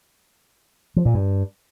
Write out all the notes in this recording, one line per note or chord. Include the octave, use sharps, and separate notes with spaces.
F3
A#2
G2